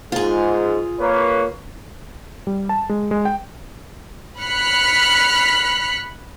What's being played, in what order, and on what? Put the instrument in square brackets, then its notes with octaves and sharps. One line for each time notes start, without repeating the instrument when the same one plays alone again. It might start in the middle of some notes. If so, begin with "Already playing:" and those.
[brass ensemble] G#2 [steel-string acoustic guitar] F4 G#4
[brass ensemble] A#3 B4 C#5
[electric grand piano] G3
A5
G#3
G#3
G5
[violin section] B5 F6 F#6 B6 C#7